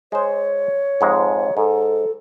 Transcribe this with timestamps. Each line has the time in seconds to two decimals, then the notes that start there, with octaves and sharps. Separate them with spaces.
0.12 G#3 C5 C#5
1.01 F2 G#2 G#3
1.57 G#2 A4